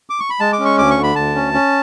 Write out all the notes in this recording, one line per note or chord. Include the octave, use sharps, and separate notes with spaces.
D6
C#6
B5
G#3 A5
D6
C#4
C#6
D2 D6
C#6
D3
B5
D2 A5
C#4
C#4